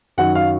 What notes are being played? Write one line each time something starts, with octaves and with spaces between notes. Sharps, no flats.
F#2 D#3 F#3 F#5
F5